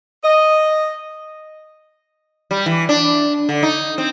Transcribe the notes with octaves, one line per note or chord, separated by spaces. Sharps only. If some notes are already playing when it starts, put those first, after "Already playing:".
D#5
G3
E3
D4
D3
D#4
C4